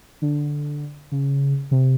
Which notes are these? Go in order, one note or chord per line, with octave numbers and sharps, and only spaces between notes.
D3
C#3
C3